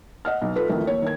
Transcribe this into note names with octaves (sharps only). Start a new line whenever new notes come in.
D#5 F#5 F6
B1
F4 A4 B4
A1 F2 D#3 A3
D#2 C#5
D#3 G#6